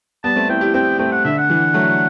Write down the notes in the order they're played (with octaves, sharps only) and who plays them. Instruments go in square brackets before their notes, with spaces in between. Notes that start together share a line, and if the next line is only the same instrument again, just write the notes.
[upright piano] G3 B3 [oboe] A5
[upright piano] A3 C4
[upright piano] C4 E4 [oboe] G5
[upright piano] E4 G4
[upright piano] C4 E4 [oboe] G5
[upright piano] A3 C4 [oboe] G5
[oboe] F#5
[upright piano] D3 [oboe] E5
[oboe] F#5
[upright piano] E3
F#3 A3